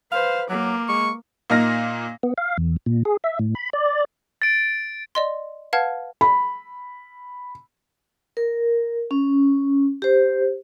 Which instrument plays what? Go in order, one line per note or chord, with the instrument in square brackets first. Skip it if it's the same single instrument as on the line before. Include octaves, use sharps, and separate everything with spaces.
[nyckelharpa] B4 [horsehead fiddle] C5 [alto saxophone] F5
[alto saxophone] F#3 [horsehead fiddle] A#3 [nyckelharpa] D6
[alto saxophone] G#3 [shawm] C#6
[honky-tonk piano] A#2 A#3 D#4 F6 A#6
[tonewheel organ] B3
F5
E2
A#2
G#4
E5
A2
B5
D5
[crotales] A6 D7
[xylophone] D5 D#5 C6
B4 F5 F#5 A5 F6 G#6
[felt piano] B5
[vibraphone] A#4
C#4
G4 C5